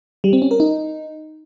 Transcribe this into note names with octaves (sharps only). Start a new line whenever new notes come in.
G3
C4
C#4
A#4
D#4